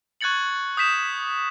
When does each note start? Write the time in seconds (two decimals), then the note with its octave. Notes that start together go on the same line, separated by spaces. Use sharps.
0.21 C#6 F#6 G#6 A6 C#7 F#7
0.77 D#6 G6 B6 E7